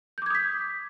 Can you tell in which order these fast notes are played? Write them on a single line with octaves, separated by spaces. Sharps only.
G6 D6 G#6 D#6 B6